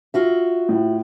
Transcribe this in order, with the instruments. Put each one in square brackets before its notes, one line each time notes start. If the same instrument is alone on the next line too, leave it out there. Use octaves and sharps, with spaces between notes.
[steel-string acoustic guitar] F4 F#4 E5
[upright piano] A2